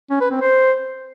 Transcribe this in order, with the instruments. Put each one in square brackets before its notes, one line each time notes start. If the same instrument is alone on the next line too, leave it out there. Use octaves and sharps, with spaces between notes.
[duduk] C#4
B4
C4
C5